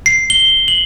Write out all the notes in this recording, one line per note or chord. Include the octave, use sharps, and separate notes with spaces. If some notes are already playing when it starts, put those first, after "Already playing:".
C7
G7
F#7